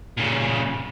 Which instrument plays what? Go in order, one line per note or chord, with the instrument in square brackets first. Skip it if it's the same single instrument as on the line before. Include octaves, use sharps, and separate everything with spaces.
[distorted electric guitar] A#2 C#3